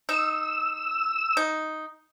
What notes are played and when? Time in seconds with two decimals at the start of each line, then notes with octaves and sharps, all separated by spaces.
0.09 D#4 E6
1.37 D#4